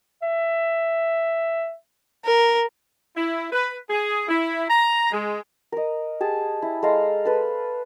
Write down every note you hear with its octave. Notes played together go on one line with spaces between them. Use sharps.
E5
A#4
E4
B4
G#4
E4
A#5
G#3
A#4 D#5
G4 G#4 A5
E4
G#3 A4 F5 A#5
A4 B4 C5